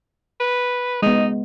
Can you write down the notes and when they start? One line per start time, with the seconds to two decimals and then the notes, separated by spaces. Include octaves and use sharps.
0.40 B4
1.02 G#3 B3 D#4